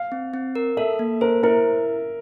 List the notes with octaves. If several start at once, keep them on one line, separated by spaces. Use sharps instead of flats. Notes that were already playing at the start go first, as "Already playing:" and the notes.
Already playing: F5
C4
C4
A#4
A4 E5
A#3
A#4 C5
E4 A#4